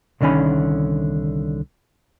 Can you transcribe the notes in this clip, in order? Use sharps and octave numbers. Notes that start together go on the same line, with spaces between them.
C2 D3 D#3 C#4 G#5 B5